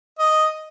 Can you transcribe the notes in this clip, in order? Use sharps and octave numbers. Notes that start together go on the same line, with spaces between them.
D#5